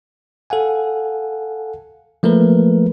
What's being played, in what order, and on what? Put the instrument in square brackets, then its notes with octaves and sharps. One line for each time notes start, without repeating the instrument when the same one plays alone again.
[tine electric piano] A4 F5 F#5 G#5
F3 A3 A#3 A#4 B4